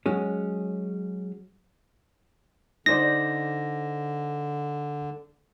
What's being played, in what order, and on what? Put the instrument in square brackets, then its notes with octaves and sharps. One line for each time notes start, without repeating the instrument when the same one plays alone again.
[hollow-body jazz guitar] F#3 G#3 C#4
[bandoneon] D3 [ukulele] D#4 C5 D5 [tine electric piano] A#6